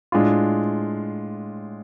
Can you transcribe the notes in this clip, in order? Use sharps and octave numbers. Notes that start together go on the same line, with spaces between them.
A2 G#3 D4 F4